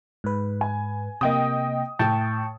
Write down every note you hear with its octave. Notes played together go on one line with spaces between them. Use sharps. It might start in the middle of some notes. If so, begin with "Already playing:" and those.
G#2 B4
G#5
C3 A#3 D#5 G5 D#6
A2 G5 A5 C#6